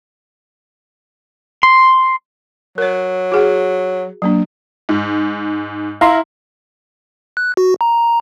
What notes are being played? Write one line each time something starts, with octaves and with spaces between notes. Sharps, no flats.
C6
F#3 A#4 C#5
F#4 G#4 F#5
F#3 A#3 D4
G#2
E4 F5 A#5 C6
F#6
F#4
A#5